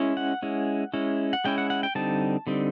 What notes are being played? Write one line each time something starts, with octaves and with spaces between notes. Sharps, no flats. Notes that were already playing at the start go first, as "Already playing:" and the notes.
Already playing: G#3 C#4 E4
F#5
G#3 C#4 E4
G#3 C#4 E4
F#5
G#3 C#4 E4 G5
F#5
F#5
G5
D3 G3 C4 D#4 A5
D3 G3 C4 D#4